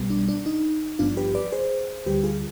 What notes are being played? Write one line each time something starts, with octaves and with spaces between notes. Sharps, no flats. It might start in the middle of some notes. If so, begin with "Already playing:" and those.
Already playing: B1 B2 G3 B3
D4
D4
D#4
G#1 G2 F3 B3 D4 F4
G4 B4
B4 D5
G#4 C5
D2 D3 G3 G4 B4
F4 G#4